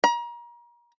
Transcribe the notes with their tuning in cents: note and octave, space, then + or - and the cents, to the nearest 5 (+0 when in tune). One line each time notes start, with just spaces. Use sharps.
A#5 +35